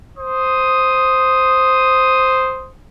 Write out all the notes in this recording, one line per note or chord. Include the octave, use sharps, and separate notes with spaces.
C5 D#6